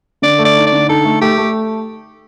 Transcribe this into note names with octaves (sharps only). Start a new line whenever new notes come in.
D3 D5
A3
D5
D#4
D5
D3
D#4 A4
A3
A3 G4
A3